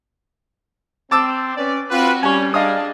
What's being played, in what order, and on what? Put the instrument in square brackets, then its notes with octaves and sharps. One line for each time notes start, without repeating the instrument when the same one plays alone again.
[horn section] C4 [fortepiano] A5 D6 E6
[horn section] C#4 B4 D5
[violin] C4 F#4 [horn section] F4 B4
[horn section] G3 [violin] C#4 [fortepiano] G#5 C#6
[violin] D4 G#4 [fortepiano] D#5 F5 D#6